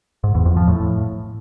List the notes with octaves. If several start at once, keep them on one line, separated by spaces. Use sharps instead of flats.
G#2
E2
F2
F3
A2